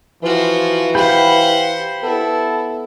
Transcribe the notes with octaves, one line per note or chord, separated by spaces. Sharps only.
E3 F3 F4 F#4
G4 C5 F5 F#5 B5
B3 E4 A4